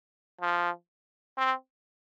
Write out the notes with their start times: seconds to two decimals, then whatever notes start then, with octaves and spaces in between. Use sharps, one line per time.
0.41 F3
1.38 C4